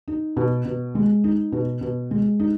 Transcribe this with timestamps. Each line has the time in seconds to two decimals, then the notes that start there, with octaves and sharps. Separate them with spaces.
0.08 D#4
0.37 B2
0.65 B2
0.95 G#3
1.24 D#4
1.52 B2
1.81 B2
2.11 G#3
2.40 D#4